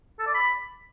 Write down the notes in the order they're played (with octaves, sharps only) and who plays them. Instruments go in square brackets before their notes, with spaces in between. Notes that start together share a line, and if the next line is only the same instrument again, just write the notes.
[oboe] A4
D5
B5